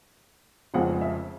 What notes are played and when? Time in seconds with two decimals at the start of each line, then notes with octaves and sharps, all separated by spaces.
0.74 F1 F2 C#3 F3 G#3 F#5
1.01 E5